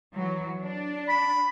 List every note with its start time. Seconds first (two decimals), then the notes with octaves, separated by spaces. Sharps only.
0.13 E3 F#3
0.60 D4
1.09 B5